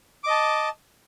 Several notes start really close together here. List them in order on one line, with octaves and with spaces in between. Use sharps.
D6 D#5 A5